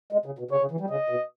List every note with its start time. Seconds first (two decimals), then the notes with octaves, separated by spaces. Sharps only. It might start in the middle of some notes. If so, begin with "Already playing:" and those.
0.12 G#3
0.26 C#3
0.39 B2
0.51 C#3 C#5
0.61 C#3
0.71 E3
0.81 G3
0.90 C#3 D#5
1.10 B2